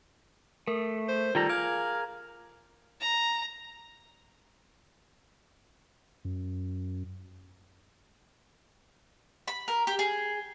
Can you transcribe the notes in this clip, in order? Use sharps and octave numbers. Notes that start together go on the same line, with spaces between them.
A3 A#4
C5
D#3 G3 F4 A4 A#5
G#4 A#4 F5 D6 G#6
A#5
F#2
B5
A#4
G4
G#4